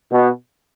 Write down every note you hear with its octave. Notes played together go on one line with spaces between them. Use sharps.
B2